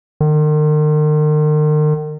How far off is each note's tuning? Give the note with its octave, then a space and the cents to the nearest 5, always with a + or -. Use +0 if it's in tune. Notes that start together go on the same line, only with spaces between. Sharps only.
D#3 -40